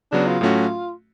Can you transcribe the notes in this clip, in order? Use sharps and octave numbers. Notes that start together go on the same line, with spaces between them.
C#3 F#3 B3 D4
F4
A2 F#3 A3 C#4 F#4